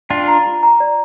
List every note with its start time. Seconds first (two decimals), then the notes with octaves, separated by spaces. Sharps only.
0.10 D4 F4 G5
0.28 A#5
0.45 F4
0.63 A#5
0.80 D5